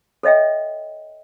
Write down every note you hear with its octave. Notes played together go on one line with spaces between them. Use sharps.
A4 C#5 D#5 E5 G5